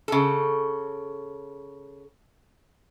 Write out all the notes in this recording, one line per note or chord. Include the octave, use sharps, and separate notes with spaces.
C#3 A4